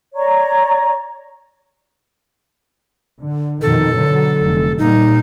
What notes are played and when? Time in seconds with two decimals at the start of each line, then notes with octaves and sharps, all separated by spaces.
0.15 C#5 D5 A#5 C#6
3.22 D3
3.62 F2 B2 D#3 A4
3.97 B2 D3 F#3
4.43 F1
4.78 A#2 G3 A#3 D#4